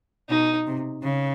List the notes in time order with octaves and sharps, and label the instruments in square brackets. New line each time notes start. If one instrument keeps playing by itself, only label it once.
[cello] B2 [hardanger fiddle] D#4
[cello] C3
C#3